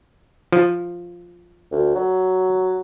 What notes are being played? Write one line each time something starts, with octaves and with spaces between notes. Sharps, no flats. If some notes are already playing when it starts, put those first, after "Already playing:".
F3
D2
F#3